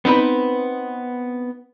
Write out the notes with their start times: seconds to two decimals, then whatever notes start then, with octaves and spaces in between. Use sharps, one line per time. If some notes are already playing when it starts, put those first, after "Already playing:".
0.05 B3 C4 D#4 B4